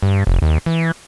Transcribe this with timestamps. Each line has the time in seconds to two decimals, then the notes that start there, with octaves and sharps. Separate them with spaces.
0.02 G2
0.27 F1
0.42 D#2
0.66 E3